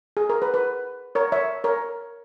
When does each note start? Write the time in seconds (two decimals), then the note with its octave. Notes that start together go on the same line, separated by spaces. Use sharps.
0.17 G#4
0.30 A#4
0.42 B4
0.54 B4
1.15 A#4 C#5
1.32 C#5 E5
1.64 A#4 C#5